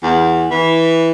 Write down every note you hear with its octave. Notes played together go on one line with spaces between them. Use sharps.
E2
E3